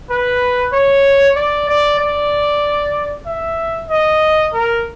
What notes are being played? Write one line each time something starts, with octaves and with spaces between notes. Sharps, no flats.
B4
C#5
D5
D5
D5
E5
D#5
A#4